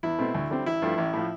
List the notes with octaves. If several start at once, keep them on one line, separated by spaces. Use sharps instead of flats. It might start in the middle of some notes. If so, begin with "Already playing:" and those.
E2 E4
B2 A3 C4
D2
D3 G3 C4
A1 E4
G2 F3 A3
A1
A2 F3